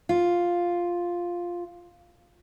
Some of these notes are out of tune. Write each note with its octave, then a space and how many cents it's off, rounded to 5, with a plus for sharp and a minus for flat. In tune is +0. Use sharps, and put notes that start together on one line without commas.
F4 +0